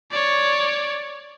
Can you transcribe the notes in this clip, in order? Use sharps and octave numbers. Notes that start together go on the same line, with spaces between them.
C#5 D5